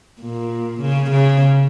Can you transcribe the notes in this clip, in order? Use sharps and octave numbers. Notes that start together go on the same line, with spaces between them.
A#2
C#3
C#3